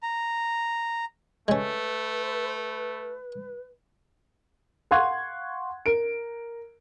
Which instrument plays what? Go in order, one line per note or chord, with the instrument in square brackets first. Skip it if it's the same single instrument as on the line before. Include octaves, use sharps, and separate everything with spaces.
[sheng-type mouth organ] A#5
[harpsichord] G#3 C#4 [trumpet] A3 [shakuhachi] B4
[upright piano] F5 F#5 C6 C#6 F#6 G#6
A#4 D7